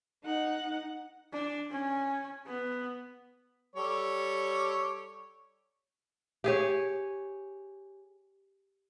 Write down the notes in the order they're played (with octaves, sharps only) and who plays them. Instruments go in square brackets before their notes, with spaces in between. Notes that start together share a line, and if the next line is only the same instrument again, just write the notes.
[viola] D#4 F#5
[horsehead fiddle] D4
C#4
B3
[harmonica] G3 A4 C#5
[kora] G4 G#4 C#5